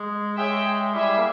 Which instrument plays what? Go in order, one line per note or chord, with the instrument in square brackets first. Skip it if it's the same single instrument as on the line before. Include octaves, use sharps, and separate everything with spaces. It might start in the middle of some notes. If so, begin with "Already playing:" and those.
Already playing: [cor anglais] G#3
[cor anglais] G#3 [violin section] G#4 C#5 E5 G5
[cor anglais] G3 [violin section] E4 G#4 E5 G#5
[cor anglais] A#3